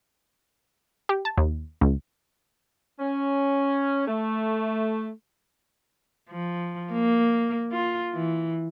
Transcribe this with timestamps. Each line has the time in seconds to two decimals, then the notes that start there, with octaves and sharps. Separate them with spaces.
1.09 G4
1.25 A5
1.38 D#2
1.81 C#2
3.00 C#4
4.07 A3
6.30 F3
6.92 A#3
7.72 F4
8.13 E3